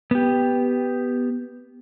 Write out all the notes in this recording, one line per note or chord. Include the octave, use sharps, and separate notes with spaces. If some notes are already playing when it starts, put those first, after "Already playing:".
B3 G4